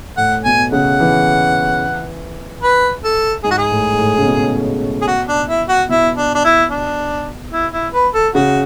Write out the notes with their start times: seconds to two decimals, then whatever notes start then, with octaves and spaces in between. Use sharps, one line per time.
0.17 A2 F#5
0.45 B2 G#5
0.72 C#3 F#5
1.00 E3
2.63 B4
3.04 A4
3.44 G#2 G#4
3.51 F#4
3.58 G#4
3.72 A2
3.93 G#2
3.99 A2
4.18 C#3
4.26 B2
5.02 G#4
5.08 F#4
5.28 D4
5.48 E4
5.69 F#4
5.89 B2 E4
6.17 D4
6.35 D4
6.45 E4
6.71 D4
7.52 E4
7.73 E4
7.93 B4
8.14 A4
8.34 C#3 F#4